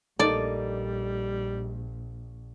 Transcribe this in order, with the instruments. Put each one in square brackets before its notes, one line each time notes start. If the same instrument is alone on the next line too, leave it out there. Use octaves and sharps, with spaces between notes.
[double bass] A#1 [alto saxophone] G3 [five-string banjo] A#3 D#4 A4 [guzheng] D5